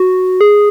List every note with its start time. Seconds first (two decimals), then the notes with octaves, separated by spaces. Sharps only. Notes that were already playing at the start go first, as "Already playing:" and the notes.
Already playing: F#4
0.41 G#4